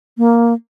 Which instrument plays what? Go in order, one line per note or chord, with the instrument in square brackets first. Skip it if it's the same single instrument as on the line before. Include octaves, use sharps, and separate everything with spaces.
[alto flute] A#3